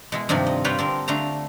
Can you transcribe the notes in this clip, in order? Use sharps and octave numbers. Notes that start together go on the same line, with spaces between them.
B2 G#3 E4
G2 C3 D#3 F3 D5
D#5
G3 F4 B4 C#5 F#5 G5
D3 C4 A#4
D3 A3 F5 A#5